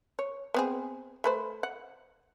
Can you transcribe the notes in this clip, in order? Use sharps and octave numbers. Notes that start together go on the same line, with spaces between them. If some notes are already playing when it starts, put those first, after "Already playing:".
C#5
B3 C4 G#4
A3 B4 C5
F#5